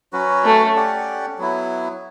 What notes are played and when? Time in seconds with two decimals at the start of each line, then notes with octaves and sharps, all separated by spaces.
0.13 F#3 C#4 F#4 B4
0.45 A3
0.75 C#4 G4 D5 F#5
1.38 F#3 B3 E4